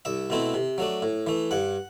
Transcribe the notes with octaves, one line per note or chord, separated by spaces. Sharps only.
C2 E5
B2 A3 C4 E4
C3
F#3 A3 D4
A2
E3 A3
G2 F#5